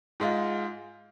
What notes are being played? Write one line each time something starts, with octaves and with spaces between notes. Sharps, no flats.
G#2 G#3 F4